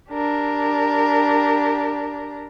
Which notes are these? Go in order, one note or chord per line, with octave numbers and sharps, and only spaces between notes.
D4 G4 A#4